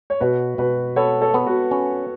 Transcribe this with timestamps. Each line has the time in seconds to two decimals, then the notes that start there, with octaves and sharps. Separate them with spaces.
0.10 C#5
0.20 B2 F#4 B4
0.58 B2 F#4 B4
0.96 B3 A4 C#5
1.21 A4 C#5
1.34 B3 A4
1.47 F#4 B4
1.71 C#4